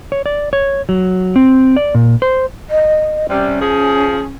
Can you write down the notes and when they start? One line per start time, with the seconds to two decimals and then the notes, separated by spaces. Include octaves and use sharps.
0.12 C#5
0.26 D5
0.53 C#5
0.89 F#3
1.36 C4
1.77 D5
1.95 A#2
2.22 C5
2.70 D#5
3.30 C3 G3 C#4
3.61 F3 G#4